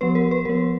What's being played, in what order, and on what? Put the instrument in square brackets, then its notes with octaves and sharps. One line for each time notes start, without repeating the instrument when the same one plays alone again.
[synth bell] F3 B3 B4
A#4
B4
F3 B3 A#4